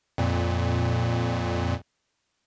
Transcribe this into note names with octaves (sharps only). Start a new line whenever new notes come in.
F2 A#2